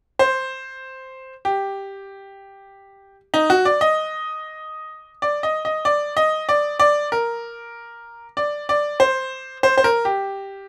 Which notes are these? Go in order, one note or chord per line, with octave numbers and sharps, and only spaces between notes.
C5
G4
D#4
F#4
D5
D#5
D5
D#5
D#5
D5
D#5
D5
D5
A#4
D5
D5
C5
C5
C5
A#4
G4